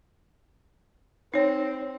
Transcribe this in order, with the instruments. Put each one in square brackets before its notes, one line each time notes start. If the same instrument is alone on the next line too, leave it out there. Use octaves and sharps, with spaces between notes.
[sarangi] C4 [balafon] D#4 C#5